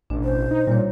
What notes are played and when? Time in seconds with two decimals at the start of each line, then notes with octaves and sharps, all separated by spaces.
0.10 A1 B2 D4
0.24 C5
0.51 D#4
0.67 A#2 G3 C#5